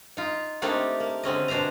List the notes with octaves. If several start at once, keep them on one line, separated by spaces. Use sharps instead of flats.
D#4 F4
A3 A#3 C4 D4 D#4 G4
A#3
D3 C4 C#4 D#5
B2 D4 C5 E5 A#5